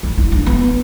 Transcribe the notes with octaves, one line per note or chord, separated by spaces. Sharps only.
E4
E4
D4
B3